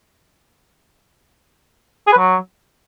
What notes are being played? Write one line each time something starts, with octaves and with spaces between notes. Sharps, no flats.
G#4
B4
F#3